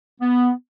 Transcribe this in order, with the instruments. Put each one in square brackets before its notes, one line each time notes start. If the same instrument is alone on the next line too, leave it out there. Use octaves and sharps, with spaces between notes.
[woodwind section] B3